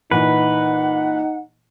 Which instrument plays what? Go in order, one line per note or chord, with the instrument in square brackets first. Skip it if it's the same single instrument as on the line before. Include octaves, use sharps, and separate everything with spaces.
[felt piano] A#2 E3 [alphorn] D#4 [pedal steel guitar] B4 [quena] F#5